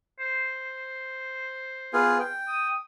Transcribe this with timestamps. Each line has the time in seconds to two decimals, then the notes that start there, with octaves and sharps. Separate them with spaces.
0.19 C5
1.93 B3 F4 G#4
2.20 G5
2.48 D#6